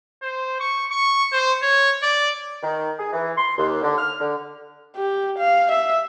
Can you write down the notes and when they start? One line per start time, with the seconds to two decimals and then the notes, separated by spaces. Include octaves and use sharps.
0.23 C5
0.60 C#6
0.91 C#6
1.32 C5
1.62 C#5
2.03 D5
2.63 D#3
2.99 G#4
3.13 E3
3.37 C6
3.58 D#2
3.82 D3
3.98 F6
4.20 D3
4.96 G4
5.39 F5
5.72 E5